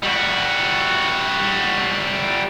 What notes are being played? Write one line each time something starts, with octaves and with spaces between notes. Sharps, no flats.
G3 F#4